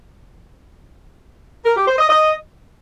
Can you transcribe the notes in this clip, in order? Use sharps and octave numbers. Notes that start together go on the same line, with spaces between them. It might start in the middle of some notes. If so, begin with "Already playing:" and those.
A#4
G4
C5
D#5
D#5